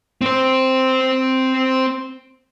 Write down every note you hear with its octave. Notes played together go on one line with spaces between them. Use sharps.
C4 C5